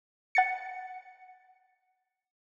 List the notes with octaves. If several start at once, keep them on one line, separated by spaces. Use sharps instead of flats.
F#5 A6 C#7